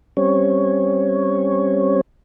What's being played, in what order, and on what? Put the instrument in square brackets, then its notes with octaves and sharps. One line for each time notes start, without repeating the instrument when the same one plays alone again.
[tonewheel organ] G3 C4 C#4 C#5